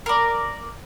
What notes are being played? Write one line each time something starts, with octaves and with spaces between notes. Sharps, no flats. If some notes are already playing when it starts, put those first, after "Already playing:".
A#4 D5